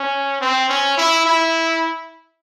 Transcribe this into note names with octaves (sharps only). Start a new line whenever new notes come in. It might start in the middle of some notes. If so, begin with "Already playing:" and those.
Already playing: C#4
C4
C#4
E4
E4